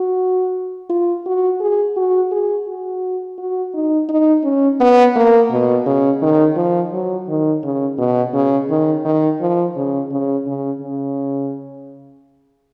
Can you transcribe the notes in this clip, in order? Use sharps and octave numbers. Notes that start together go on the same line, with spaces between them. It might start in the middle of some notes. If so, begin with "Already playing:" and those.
Already playing: F#4
F4
F#4
G#4
F#4
G#4
F#4
F#4
D#4
D#4
C#4
B3
A#3
B2
C#3
D#3
F3
F#3
D#3
C#3
B2
C#3
D#3
D#3
F3
C#3
C#3
C#3
C#3